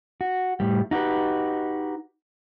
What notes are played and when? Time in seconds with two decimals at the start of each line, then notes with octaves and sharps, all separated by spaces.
0.21 F#4
0.60 A2 G3
0.91 D#4 F#4 G4 B4